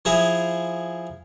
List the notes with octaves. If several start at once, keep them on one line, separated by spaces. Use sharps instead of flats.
F3 E4 G#4 A#5